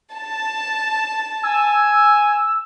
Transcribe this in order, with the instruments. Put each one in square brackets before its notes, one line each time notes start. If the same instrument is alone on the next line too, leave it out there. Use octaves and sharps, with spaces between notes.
[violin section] A5
[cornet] G#5 [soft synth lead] E6